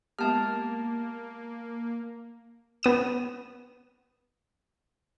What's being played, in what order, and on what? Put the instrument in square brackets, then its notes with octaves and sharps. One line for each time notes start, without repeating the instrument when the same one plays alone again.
[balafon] G#3 B3 G4 [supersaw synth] A#3 [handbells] A5 F6
[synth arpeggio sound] B3 D#6 E7